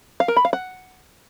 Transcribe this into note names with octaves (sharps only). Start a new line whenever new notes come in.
F5
A#4
B5
F5
F#5